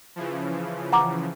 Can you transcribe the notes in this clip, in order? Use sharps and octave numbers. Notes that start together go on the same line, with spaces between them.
C#3 E3 F3
F#5 A#5 D6